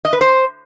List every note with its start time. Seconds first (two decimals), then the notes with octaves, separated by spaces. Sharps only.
0.05 D#5
0.13 B4
0.21 C5